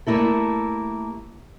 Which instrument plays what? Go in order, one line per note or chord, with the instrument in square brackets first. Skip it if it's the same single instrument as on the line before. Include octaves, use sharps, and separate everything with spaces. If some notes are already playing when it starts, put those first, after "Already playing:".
[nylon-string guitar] G3 A3 A#3 E4 A4